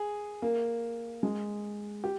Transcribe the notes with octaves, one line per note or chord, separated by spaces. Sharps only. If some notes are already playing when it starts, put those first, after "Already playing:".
Already playing: G#4
A#3
G#3
G4